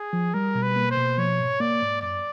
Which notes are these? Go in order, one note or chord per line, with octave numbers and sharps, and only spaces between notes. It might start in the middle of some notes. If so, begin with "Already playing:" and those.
Already playing: G#4
F3
G3 A#4
B2
B4
A#3
C5
B2
F3 C#5
G#2
A#3 D5
G#2
F#2 D5